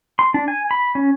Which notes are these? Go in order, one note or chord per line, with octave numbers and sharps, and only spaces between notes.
C6
D4
G#5
B5
C#4